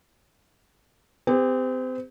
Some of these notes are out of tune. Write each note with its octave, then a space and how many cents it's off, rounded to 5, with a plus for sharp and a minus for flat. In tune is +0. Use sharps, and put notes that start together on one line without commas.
C4 -35 G4 +35